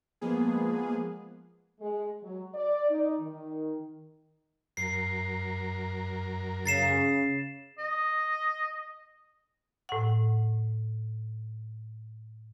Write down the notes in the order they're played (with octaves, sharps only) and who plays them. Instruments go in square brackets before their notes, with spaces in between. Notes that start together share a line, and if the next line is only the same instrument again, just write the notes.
[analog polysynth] F3 G#3 A#3 B3 G#4
[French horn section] G#3
F#3
D5
D#4
D#3
[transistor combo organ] F#2 A#4 [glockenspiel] C7
[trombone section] C#3 [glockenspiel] A6 C7 E7
[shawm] D#5
[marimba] A2 F#5